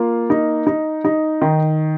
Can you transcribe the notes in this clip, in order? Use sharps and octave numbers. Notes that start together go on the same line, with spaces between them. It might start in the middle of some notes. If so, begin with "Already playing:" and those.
Already playing: A#3 F4
D#4
D#4
D#4
D#3